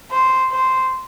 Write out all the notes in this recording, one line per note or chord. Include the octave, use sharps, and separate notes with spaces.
C5
C5